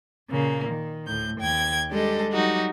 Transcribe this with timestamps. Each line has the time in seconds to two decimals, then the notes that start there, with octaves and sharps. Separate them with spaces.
0.29 A#2 C#3 A#3
0.68 D#3
1.06 D2 A2 G6
1.39 D#2 G5 G#6
1.90 G3 G#3 D4 G4 A4 D#5
2.31 F#3 G3 D#4 F#4 G4